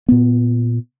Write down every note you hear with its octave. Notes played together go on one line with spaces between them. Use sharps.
A#2 B3